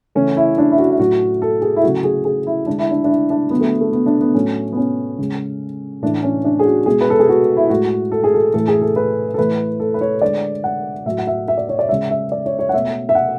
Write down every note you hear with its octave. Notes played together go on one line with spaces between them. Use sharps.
C#3 E3 A3 C#4
E4
D4
E4
F#4
E4
A2 F#3 A3 F#4
A4
G#4
E4
C#3 F#3 A3 F#4
G#4
G#4
E4
D3 G#3 D4
E4
D4
D4
E4
D4
D3 F#3 A3 B3
A3
A3
B3
D4
B3
A2 F#3 A3 C#4
B3
C#4
C#3 G#3
A2 E3 A3 D4
C#4
D4
G#4
F#4
B2 G#3 G#4
B4
A4
G#4
F#4
E4
A2 G#3 F#4
A4
G#4
A4
A2 E3 A3 A4
G#4
A4
B4
A4
A2 E3 A3 B4
A4
B4
C#5
D3 G#3 D5
F#5
A2 F#3 A3 E5
F#5
E5
E5
D5
C#5
D5
C#3 G#3 E5
E5
D5
C#5
C#5
F#5
B2 A3 E5
E5
F#5